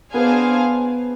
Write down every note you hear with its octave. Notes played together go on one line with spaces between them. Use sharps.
B3 D4 G#4 C5 F5 G#5